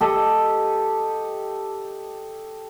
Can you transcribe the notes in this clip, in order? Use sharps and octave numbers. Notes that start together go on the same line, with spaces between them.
G4 A4 D#5